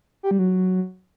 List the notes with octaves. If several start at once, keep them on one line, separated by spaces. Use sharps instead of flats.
G4
G3
F#3